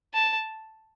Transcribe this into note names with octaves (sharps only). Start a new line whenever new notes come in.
A5